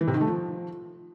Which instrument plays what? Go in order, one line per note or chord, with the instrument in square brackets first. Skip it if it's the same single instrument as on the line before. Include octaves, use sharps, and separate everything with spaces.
[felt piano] E3
C3
D#3
A3
F3